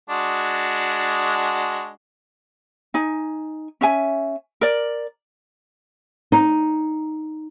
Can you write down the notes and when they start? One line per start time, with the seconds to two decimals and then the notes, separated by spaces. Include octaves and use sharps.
0.10 G#3 D4 F#4
2.94 D#4 G#5
3.81 C#4 E5 G#5
4.61 A#4 D5
6.32 D#4